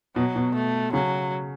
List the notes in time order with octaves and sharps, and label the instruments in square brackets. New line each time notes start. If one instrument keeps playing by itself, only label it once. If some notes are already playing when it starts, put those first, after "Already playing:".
[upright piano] B2 [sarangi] F#3
[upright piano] B2
[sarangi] A3
[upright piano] C#3 [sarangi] F#3